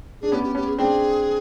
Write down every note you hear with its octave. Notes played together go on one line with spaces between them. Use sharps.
D4 G#4
B3 C#4 G4
G4
B3 C#4 G4
G#4
C4 D4 G#4